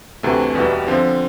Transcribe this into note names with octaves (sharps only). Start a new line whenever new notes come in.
D2 C3 E3 A3
E2 B2 G3 B3 E4
D3 F3 C4 F4